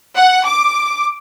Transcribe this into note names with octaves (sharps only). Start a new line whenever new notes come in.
F#5
D6